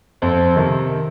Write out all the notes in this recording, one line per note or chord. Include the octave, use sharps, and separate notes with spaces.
F2 C4
C3 D#3